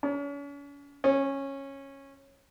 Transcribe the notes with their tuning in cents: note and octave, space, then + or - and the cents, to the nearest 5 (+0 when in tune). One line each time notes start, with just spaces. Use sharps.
C#4 +40
C#4 -15